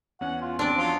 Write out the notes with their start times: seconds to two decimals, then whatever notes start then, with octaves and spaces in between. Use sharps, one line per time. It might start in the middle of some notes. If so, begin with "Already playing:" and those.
0.21 E2 C#4 F#5
0.42 F4
0.59 C4 D4 D5
0.77 F3 F#3 F4 C6